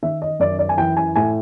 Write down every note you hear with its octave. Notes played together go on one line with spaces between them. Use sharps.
D#3 E5
D#5
F#2 D5
D5
G#5
E3 G5
G#5
A2 G#5